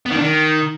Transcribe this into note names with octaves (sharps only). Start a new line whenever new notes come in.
B3
D#3
D4
D#3